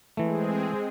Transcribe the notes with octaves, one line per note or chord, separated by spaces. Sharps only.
E3 G#3 A3 C4 G#4